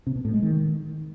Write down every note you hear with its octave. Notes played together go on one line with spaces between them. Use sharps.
C3
B2
A2
G#3
D#3